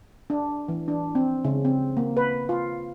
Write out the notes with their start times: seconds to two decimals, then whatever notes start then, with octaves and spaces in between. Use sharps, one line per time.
0.30 D4
0.68 E3
0.88 D4
1.15 C4
1.45 C#3
1.65 C4
1.97 A#3
2.17 B4
2.49 F4